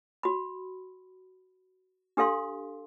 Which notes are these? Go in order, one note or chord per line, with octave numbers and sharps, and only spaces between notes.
F#4 B5
D4 G4 A4 F5 C6